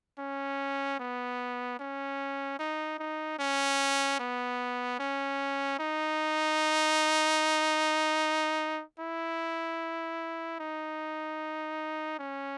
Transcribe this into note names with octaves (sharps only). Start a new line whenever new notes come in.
C#4
B3
C#4
D#4
D#4
C#4
B3
C#4
D#4
E4
D#4
C#4